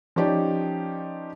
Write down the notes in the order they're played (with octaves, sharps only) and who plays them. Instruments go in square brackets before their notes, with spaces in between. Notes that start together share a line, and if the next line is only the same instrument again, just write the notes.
[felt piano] F3 C#4 D#4 G4 D5